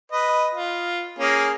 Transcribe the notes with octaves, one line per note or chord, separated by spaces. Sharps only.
B4 D#5
F4
A#3 C#4 G#4